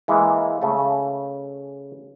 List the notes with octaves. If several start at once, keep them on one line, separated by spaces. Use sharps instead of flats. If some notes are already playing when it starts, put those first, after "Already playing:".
E3 G#3 A#3
C#3 A3